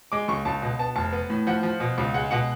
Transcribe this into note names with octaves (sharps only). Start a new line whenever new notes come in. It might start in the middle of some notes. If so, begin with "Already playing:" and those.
G#3 D6
C#2 C#6
C#2 A5
B2
B3 A5
F1 A5
B3
A2
F3 F#5
F3
B2
C#2
G#3 F#5
B2 F#5